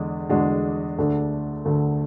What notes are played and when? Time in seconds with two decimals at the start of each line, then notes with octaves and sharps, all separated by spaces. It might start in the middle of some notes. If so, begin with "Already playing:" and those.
Already playing: E2 D3 G#3 D4
0.29 E2 D3 G#3 D4 F#4
0.98 D2 D3 A3 D4
1.65 D2 D3 A3 D4